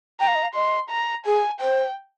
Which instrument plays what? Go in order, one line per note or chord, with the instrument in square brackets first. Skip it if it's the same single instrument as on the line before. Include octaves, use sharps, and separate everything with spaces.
[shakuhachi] G5 [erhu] A#5
[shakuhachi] F5
D#5
F5
[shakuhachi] D#5 [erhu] C6
[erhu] A#5
[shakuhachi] G#4 [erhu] G#5
[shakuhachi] C5 [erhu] G5